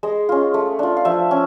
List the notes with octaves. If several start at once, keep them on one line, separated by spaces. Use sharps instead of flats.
G#3 D#5
C#4 F4
A3
D4 F4
F5
F3 E5
C#4